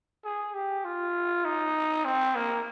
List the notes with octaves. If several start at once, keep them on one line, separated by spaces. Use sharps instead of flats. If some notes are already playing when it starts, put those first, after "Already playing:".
G#4
G4
F4
D#4
C4
A#3